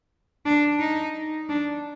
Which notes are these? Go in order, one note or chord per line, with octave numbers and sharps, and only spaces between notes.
D4
D#4
D4